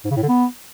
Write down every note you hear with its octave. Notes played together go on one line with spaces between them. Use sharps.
G#2
C#3
A2
D3
B3